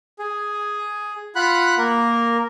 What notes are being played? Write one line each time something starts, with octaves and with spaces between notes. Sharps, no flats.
G#4
F4 F#5 B5 F#6
A#3 A#4